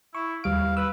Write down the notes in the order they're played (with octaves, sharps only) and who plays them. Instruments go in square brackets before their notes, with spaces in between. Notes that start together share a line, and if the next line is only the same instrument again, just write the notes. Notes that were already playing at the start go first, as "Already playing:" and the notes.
[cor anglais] E4 [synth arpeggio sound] C#6
[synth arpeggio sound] D#2 G3 D7 [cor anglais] F5
[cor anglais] B4 [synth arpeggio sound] E6